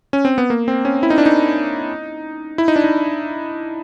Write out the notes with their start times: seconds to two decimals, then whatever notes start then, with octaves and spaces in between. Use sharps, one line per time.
0.13 C#4
0.25 C4
0.38 B3
0.50 A#3
0.68 C4
0.85 C#4
1.03 E4
1.10 D#4
1.18 D4
1.26 D#4
2.58 E4
2.68 D#4
2.76 D4
2.84 D#4